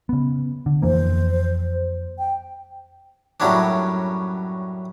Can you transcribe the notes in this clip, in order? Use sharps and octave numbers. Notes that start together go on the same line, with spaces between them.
C#3 B3
D3
F2 E3 A#3 C5
G5
F#2 A2 F#3 G3 C#4 D4